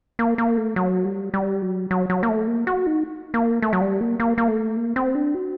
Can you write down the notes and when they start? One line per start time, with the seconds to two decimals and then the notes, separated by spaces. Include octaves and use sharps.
0.19 A#3
0.38 A#3
0.57 A3
0.76 F#3
1.05 G3
1.34 G3
1.62 F#3
1.91 F#3
2.10 F#3
2.23 A#3
2.29 A3
2.47 A#3
2.67 F#4
2.86 D#4
3.34 A#3
3.62 A3
3.73 F#3
3.81 G3
4.01 A#3
4.20 A#3
4.38 A#3
4.48 A3
4.77 A#3
4.96 C4
5.15 D4
5.34 F#4